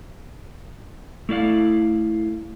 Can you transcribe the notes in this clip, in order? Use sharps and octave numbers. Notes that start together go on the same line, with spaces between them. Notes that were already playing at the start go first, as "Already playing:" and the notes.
A3 E4 D5 F5